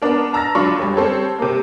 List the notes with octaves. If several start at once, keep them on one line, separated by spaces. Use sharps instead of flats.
B3 D4 A#4
A5 A#5 E6 F6 A6 A#6
F#3 D4 F4 B5 C#6
F1 G3
G3 C4 A4 C#5
C3 A#3